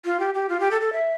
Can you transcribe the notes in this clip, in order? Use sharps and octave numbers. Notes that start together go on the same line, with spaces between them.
F4
G4
G4
F4
G4
A4
A4
E5